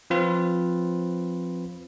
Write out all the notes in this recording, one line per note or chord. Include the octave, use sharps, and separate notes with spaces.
F3 C4 F4 B4